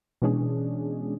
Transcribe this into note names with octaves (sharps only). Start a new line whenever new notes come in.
B2 E3 G#3 C#4 D4 G#4